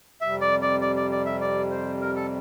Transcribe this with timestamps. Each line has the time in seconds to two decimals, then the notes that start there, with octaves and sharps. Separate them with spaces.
0.21 F2 C3 G3 E5
0.41 D5
0.62 D5
0.81 D5
0.96 D5
1.11 D5
1.26 E5
1.41 D5
1.71 C5
2.01 A#4
2.16 A4